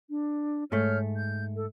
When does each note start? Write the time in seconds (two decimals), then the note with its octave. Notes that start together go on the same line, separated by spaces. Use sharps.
0.10 D4
0.72 G#2 A3 C#5 F6 G6
1.16 G6
1.55 A4